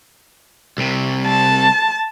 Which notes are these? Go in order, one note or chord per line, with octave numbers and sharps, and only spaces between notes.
C2 C3
A5